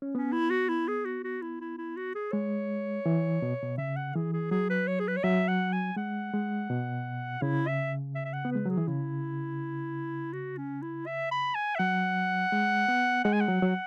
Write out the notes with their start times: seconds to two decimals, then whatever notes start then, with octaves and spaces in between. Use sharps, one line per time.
0.02 C#4
0.15 B3 C#4
0.32 E4
0.50 F#4
0.69 E4
0.88 G#4
1.05 F#4
1.24 F#4
1.42 E4
1.61 E4
1.78 E4
1.97 F#4
2.15 G#4
2.32 G#3 C#5
3.06 E3
3.42 B2
3.63 B2
3.78 C#3 E5
3.96 F#5
4.15 E3 G#4
4.33 G#4
4.51 F#3 G#4
4.70 B4
4.88 C#5
5.00 G#4
5.08 B4
5.17 C#5
5.24 F#3 E5
5.48 F#5
5.72 G#5
5.96 G#3 F#5
6.34 G#3
6.70 B2
7.42 C#3 E4
7.67 E5
8.15 E5
8.25 E5
8.33 F#5
8.45 B3
8.51 G#3 B4
8.66 F#3 G#4
8.77 E3
8.88 C#3 E4
10.33 F#4
10.58 C#4
10.82 E4
11.07 E5
11.31 B5
11.55 G#5
11.75 E5
11.79 F#3 F#5
12.52 G#3
12.88 B3
13.24 G#3 F#5
13.33 G#5
13.41 F#5
13.48 F#3
13.62 F#3